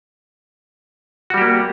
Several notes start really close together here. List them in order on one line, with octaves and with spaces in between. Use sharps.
F#4 G3 G4 A#3